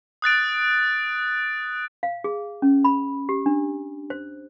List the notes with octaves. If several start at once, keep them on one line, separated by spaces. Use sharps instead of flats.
D#6 F#6 A6 D7
F5
G#4
C#4
B5
G4
D4
C5